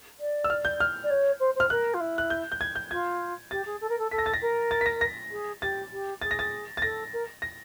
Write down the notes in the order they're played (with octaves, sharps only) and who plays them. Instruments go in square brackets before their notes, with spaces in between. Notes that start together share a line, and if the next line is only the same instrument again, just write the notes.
[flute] D5
[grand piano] E6
F6
G6
F6
[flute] D5
C#5
C5
[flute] C5 [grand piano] F6
[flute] A#4 [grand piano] F#6
[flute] F4
E4
[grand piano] F#6
G6
G6
G#6
G6
[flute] F4 [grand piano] G#6
[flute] G4 [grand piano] A6
[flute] G#4
A4
A#4
A4
[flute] A4 [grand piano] B6
[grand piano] A#6
A6
A#6
[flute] A#4
[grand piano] A6
B6
A#6
A#6
[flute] G#4
[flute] G4 [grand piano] A6
[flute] G4
[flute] G#4 [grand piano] A6
[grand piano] A#6
A6
A6
[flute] A4 [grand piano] A#6
[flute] A#4
[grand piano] A#6